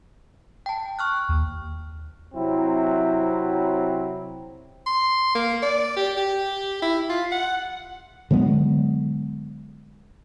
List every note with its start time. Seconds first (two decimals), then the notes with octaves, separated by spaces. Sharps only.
0.66 G5 A5
0.99 C#6 F6 F#6
1.29 D#2
2.35 C3 F#3 C4 E4
4.86 C6
5.35 A#3
5.62 D5
5.96 G4
6.17 G4
6.82 E4
7.10 F4
7.31 F#5
8.31 D3 F#3 G#3 B3